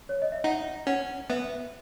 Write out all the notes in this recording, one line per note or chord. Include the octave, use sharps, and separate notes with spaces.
C#5
D#5
E5
D#4 F#5
C#4 F#5
B3 E5